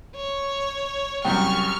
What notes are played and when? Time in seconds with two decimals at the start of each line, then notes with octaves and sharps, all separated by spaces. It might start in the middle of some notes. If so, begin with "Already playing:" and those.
0.16 C#5
1.25 C2 F#2 G5 C#6 F6